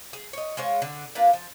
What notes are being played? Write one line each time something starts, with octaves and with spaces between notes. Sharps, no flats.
G#4
C#5 D#5
G#3 F4 C5 C#5
D3
A#3 D4 F4 B4
F3